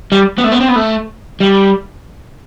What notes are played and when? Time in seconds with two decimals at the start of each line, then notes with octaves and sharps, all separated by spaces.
0.12 G3
0.38 B3
0.44 A3
0.52 B3
0.60 C4
0.68 B3
0.76 A3
1.40 G3